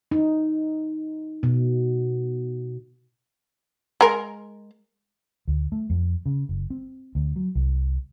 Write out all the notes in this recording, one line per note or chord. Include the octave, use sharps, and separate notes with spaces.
D#4
B2
G#3 A#4
D2
A3
F2
C#3
F#1
C4
D2
F#3
C2